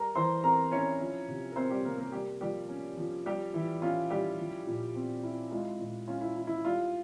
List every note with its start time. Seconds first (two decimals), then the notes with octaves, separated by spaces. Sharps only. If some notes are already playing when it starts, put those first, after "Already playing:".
Already playing: G3 A#4 A#5
0.15 E3 C5 C6
0.43 C4 A#4 A#5
0.71 C#4 E4 C#5
1.01 F3
1.28 C3
1.52 A#4
1.56 C4 C5
1.70 G3 G4
1.84 C3 A#3 A#4
1.98 A#3 A#4
2.12 G3 A#3 G4
2.41 F3 G3 G4
2.69 C#4
2.97 F3
3.26 G3 G4
3.54 E3 E4
3.82 C#4 F4
4.10 G3 E4 G4
4.39 F3
4.67 A#2
4.95 C4
5.23 E4
5.51 G#3 F4
5.80 A#2
6.08 C#4 F4
6.21 E4
6.36 E4
6.47 E4
6.65 G3 F4